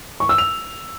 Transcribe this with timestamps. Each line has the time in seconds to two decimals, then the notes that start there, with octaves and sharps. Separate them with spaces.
0.20 C#6
0.29 E6
0.38 F7